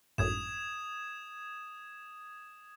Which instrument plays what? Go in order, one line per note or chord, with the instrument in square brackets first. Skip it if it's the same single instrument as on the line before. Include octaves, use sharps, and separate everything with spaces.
[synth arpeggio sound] G#1 F#2 A2 [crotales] D#6 G#6 E7